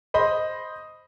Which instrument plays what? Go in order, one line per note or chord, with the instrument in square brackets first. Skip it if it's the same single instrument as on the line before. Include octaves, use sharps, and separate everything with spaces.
[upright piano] C5 D#5 B5